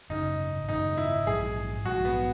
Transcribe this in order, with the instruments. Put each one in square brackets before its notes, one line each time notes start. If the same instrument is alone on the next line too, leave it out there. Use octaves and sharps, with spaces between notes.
[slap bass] G#1 F#2 C#3 [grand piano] D#4
[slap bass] G#1 F#2 C#3 [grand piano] D#4
[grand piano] E4
[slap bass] A#1 G#2 F#3 [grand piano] G#4
[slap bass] A#1 G#2 F#3 [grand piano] F#4
[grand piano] B3